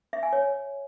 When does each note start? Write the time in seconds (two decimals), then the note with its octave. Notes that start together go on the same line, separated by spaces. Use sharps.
0.13 E5
0.23 G#5
0.33 C#5